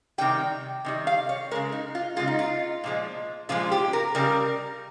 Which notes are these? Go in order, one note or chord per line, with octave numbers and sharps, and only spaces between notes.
C3 D#3 G3 G5
C3 D#3 G3
F5
C#5
C#3 G#3 A#4
D#4
F4
C#3 G#3 F4
D#4
F4
A#2 F3 G#3
A#2 F3 G#3 F4
G4
A#4
C#3 G3 A#4